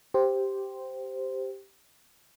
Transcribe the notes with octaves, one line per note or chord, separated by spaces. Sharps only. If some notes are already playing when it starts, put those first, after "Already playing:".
G4 C5